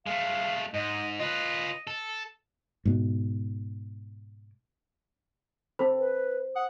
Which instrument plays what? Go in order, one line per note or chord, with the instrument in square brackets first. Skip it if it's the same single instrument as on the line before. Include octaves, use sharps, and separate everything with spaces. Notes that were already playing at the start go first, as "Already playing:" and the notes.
[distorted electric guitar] G#3 A3 [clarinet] F5
[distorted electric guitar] G#2 [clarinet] D#5
[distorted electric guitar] F4 B4 [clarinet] D#5
[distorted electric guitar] A4
[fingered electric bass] G#2 B2
[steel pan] C4 A4 B5 [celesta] C5
[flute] B4
[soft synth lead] F#5 [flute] D#6